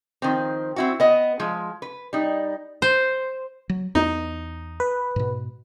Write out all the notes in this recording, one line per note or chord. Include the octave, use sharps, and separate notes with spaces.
D#3 F3 C4
C4 E4 F#4
B3 D#5
F3 G#3
B4
G3 D#4
C5
F#3
E2 B3 D#4
B4
G#2 B2